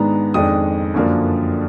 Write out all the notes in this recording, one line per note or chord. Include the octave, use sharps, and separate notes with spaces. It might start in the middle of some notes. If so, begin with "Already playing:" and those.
Already playing: G#2 D#3 G#3 B3 D4 A#5
F2 D#3 G#3 D4 D#6
F#2 D3 F3 A#3 D4